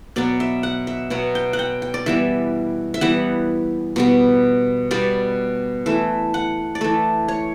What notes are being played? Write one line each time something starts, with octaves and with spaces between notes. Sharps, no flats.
B2 F#3 B3 D5
E5
F#5
E5
B2 F#3 B3 F#5
G5
F#5
G5
G5
D5
E3 G3 B3 E5
E5
E3 G3 B3 F#5
B2 G3 B3
B2 G3 B3 D5
E3 A3 E5
F#5
D5
E3 A3 E5
C#5